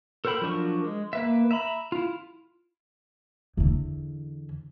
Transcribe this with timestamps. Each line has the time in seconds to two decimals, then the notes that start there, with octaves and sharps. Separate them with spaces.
0.25 A4 A#4 C5 G5 B5
0.41 F3 F#3 D4 A#4 C#6
0.84 G#3
1.13 A#3 B4 E5
1.51 E5 A#5 B5
1.92 E4 F4
3.57 E2 D3